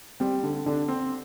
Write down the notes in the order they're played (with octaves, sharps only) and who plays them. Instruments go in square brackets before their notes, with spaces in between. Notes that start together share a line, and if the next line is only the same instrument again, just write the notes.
[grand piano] G3 [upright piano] C4
[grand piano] D3
[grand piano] D3 [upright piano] D4
[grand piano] C4